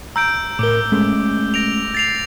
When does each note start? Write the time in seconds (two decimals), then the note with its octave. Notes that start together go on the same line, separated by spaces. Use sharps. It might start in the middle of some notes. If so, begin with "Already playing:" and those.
0.16 A#5 E6 G6 D7
0.59 A2 A#4 D6 D7 G7
0.92 G#3 A3 C#4
1.54 A#6 D7 F7
1.95 A6 C7 F7